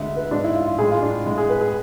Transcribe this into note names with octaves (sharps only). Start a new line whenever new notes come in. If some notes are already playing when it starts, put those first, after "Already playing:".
Already playing: D2 D3 G#3 E5
B4
G#2 G#3 D4
E4
F4
F4
A2 G#3 G#4
F4
D4
A2 G#3
G#4
B4
G#4